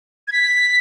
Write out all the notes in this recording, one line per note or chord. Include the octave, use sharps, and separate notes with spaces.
G#6
B6